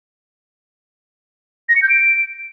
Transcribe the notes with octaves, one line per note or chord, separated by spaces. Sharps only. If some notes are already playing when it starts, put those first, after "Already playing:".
A#6
C#7
G6
D7